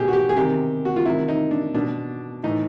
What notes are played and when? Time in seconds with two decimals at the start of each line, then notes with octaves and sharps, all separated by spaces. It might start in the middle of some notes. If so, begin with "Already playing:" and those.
Already playing: B2 G4 G#4
0.08 F#4
0.13 G4
0.29 G#4
0.37 C3 D#3 G4
0.85 F#4
0.96 F4
1.05 C3 D#3 E4
1.28 D#4
1.51 D4
1.75 B2 D4
2.43 A2 E3 D#4